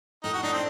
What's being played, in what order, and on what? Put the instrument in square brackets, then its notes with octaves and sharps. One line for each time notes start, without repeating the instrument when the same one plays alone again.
[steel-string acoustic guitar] A2 [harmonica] D#4
[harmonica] F#4
[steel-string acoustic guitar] D4 [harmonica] D#4
[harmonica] C4